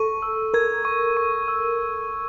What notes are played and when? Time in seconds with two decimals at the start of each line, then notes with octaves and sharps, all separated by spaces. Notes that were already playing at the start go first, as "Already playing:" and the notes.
Already playing: A4 C#6
0.22 E6
0.54 A#4 G#6
0.85 C#6
1.17 C#6
1.48 E6